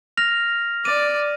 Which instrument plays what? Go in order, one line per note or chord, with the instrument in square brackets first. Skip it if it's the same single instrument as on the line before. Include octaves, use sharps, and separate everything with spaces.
[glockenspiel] F6 A#6 F7
[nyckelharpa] D5 [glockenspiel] D#7